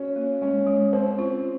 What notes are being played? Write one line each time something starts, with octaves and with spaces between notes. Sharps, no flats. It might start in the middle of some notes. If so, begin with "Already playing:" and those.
Already playing: C#4 F#4
A#3
G#3 C#4
G#3
C4 C#4
F4